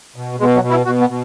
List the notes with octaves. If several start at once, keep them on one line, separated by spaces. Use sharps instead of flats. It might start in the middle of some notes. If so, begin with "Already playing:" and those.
B2
B2 G#3
F#3
B2
E4
B2 F#4
B3
B2